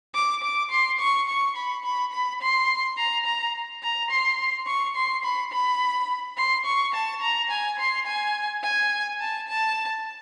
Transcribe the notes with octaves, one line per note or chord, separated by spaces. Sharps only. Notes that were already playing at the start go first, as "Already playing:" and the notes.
D6
D6
C6
C#6
C#6
B5
B5
B5
C6
A#5
A#5
A#5
C6
C#6
C6
B5
B5
C6
C#6
A5
A#5
G#5
C6
G#5
G#5
A5
A5